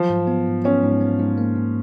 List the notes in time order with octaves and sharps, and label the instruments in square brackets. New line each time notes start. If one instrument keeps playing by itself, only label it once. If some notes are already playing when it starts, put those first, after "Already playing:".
Already playing: [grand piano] F3 [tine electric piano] F#3
[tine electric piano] G#2
B3
G#2
[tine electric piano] B3 [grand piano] C#4
[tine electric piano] G#2
B3
G#2
A#3
G#2